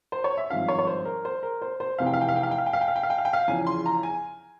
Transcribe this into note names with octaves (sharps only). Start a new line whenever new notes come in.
C5
C#5
E5
G#1 G2 F3 F5
C#5
C#5
C5
A#4
C5
A#4
C5
C5
F1 E2 C3 F5
G5
F5
G5
F5
G5
F5
G5
F5
G5
F5
G5
F5
G5
F5
G5
F5
G5
F5
E2 C#3 F3 G#5
C6
A#5
G#5